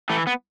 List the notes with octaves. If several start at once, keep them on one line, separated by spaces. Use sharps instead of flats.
E3 A3
B3